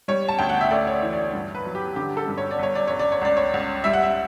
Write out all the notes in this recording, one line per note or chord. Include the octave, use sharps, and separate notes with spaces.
G3 C#5
A5
D2 G5
F#5
E5
A3 D5
C#5
D5
E3
D5
G2
B4
F#3
G4
D3 G4
A4
G2
C#5
D5
G1 C#5
D5
G1 C#5
D5
C#5
C#2 D5
C#5
C#2
G3 E5
F#5
E5